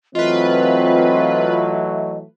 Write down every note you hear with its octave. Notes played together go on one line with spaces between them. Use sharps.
E3 F#3 A3 C4 F4 B4 D#5